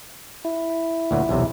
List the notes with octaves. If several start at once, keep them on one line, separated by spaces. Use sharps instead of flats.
E4
D2 A#2 F#3
B1 E2 C3